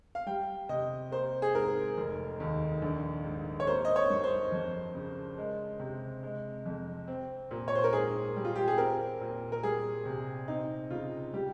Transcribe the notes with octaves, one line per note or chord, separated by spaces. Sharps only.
F5
G3 G5
C3 D#5
A#3 C5
G#4
G#2 A#4
F1
D#2
A#1
G#2
C#5
A#3 C5
D#5
C#5
G2
C5
F2
C#3
G#3
C3
G#3
F2
C4
A#2
C#5
C5
A#4
G#2 G#4
G3
F4
G4
G#4
C4 A#4
A#2
A#4
G3 G#4
C3
C4 D#4
C#3 F4
G3 G4